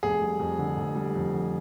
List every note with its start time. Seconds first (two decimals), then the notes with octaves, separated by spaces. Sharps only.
0.03 F1 G#4
0.22 G3
0.39 F2
0.59 D3
0.77 F1
0.96 G3
1.15 F2
1.33 D3